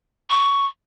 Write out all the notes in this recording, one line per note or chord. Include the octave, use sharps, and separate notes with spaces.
C#6